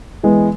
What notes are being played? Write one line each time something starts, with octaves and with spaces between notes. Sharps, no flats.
E3 G#3 B3